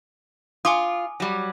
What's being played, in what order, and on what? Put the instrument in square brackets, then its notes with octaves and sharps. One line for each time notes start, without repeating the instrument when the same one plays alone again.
[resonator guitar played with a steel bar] F4 [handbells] G#5 D6 D#6
[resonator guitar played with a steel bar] F#3 G3